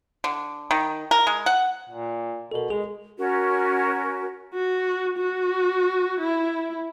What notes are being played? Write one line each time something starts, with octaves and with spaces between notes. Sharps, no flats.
D3
D#3
A#4
G#3
F#5
A#2
B2 A4 A#4
G#3 G#4
C#4 F#4 A#4
F#4
F#4
E4